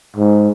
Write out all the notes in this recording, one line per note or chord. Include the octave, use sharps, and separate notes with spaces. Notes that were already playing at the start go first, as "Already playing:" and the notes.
G#2